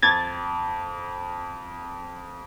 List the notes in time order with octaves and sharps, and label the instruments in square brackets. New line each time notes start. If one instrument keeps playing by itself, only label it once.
[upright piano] F2 [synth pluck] G#6 A6